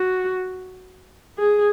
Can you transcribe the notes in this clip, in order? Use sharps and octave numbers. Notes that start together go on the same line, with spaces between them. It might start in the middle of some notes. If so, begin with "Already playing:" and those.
Already playing: F#4
G#4